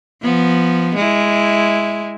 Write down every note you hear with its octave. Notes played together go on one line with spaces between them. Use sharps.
F3 B3
G#3 E4